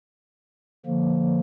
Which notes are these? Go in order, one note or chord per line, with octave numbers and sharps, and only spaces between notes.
D3 F3 A#3